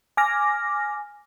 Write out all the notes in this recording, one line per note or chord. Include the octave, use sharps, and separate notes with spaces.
G#5 D6 F6 A#6